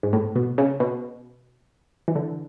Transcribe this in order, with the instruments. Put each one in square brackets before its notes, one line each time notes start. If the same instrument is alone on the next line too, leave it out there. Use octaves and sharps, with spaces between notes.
[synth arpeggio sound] G#2
A2
B2
C#3
B2
E3
D3